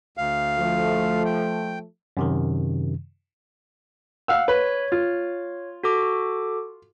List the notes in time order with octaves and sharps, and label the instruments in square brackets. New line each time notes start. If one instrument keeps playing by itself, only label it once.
[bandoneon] D2 F5
[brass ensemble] F3 A3
[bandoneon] G5
[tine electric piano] F#2 C3 D#3
[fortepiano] F5 F#5 E6
[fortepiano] B4 [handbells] C#5
[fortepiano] F4
[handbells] F#4 A4 D6